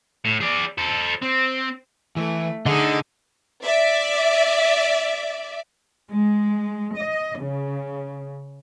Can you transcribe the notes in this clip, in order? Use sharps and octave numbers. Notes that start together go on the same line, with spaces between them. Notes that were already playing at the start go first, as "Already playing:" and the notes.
A2
G#4 D5
A4 C5
C4
E3 A3
D3 D#4 G#4 D#5
D5 E5
G#3
D#5
C#3